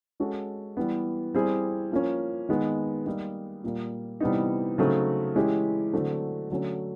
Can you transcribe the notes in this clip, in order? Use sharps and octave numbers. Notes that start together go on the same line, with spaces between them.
G#3 C#4 F#4 A4
E3 G3 B3
G3 C4 E4 G#4
F3 A#3 C#4
D#3 G#3 B3 D#4
G3 A#3 D#4
A#2 G3 A#3
C3 E3 G3 B3 D#4
C#3 F#3 A3 C4 D#4
E3 G#3 C#4 E4 G4
D3 F#3 A3 C4
D3 F#3 A3 C#4